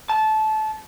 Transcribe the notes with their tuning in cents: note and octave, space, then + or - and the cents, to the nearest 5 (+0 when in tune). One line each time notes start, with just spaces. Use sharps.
A5 -20